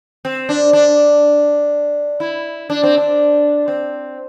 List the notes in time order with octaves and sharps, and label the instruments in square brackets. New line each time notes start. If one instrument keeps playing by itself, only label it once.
[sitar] C4
D4
D4
E4
D4
C4
D4
C4